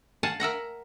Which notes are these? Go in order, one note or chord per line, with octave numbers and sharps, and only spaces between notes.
F5 F#5 G#5 A5
A#4 E5 F#5 A#5